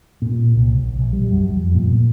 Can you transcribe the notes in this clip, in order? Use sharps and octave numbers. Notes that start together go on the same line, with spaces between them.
A#2
C2
A#1
A#1
G3
F#2
F2
A#2
A#2